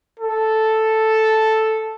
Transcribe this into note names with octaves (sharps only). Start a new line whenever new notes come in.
A4